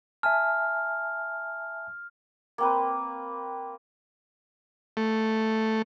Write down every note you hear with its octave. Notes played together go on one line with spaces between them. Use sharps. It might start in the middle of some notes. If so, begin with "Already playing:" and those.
E5 G#5 A5 F6
A#3 C4 B4
A3